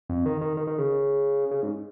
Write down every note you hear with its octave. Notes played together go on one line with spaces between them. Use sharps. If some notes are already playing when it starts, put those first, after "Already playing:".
F2
D#3
D#3
D#3
D#3
C#3
C#3
G#2